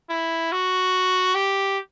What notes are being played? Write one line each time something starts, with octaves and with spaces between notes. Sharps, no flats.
E4
F#4
G4